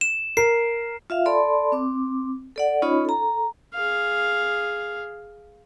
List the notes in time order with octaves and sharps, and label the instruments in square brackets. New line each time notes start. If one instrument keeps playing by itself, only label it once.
[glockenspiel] E7
[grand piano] A#4 [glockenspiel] C7
[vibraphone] F4 E5 F5
A4 D5 A5 B5 C6
C4 D6
A4 D5 F#5
C#4 D#4 F4 C#5 D#5 B5
A4 A#5
[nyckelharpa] G#4 F5